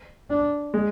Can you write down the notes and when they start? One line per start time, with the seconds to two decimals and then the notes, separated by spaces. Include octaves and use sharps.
0.30 D4
0.74 G#3